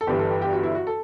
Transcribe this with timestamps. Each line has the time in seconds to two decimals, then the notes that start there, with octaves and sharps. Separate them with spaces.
0.01 A4
0.07 G1 G2 E3 G4
0.19 A4
0.30 G4
0.42 G4
0.53 F#4
0.63 E4
0.75 F#4
0.87 A4